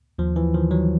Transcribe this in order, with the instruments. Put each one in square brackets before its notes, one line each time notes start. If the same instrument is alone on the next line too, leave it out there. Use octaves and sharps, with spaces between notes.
[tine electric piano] D#2 F3
E3
D#3 F3
F#3